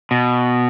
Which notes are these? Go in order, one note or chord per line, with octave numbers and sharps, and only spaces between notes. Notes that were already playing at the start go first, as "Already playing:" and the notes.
B2